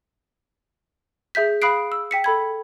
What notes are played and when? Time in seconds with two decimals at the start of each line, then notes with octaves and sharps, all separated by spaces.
1.35 G#4 E5 G6 B6
1.62 F5 B5 D#6 F#6 C7 D7
1.92 E6
2.11 G5 B6 C#7
2.24 A4 B5 G#6